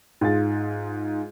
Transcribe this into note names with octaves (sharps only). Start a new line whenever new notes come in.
G#2 F4 G#4 A6